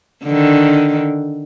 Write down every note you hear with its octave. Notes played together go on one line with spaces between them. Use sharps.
D3 D#3